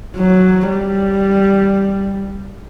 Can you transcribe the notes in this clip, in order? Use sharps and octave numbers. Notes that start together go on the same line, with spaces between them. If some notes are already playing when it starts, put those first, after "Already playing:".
F#3
G3